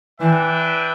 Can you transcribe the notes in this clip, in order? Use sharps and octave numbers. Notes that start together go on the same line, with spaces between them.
E3 D4 B4 E5 G5